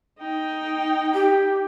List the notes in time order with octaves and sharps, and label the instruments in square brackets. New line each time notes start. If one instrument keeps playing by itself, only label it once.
[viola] D#4 G5
[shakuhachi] G4